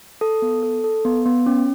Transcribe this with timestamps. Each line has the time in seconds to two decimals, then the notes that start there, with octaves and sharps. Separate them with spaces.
0.21 A4
0.42 B3
0.63 A4
0.84 A4
1.05 B3
1.26 B3
1.46 C#4